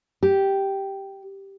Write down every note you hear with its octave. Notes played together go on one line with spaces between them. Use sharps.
G4